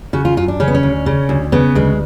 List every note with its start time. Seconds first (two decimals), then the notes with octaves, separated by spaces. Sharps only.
0.13 C#3 F#4
0.25 F4
0.37 F#2 F4
0.48 D4
0.60 C#3 C#4
0.68 B3
0.75 C#4
0.83 D2
1.06 C#3
1.29 D2
1.52 C#3 B3
1.75 D2 G#3